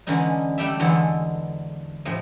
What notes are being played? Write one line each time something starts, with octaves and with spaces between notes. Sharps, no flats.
D3 E3 G#3 C#4 D#4
G3 A3 G4 A4 E5
E2 D3 E3 F#3 G#3 A4
A2 C3 F3 D#5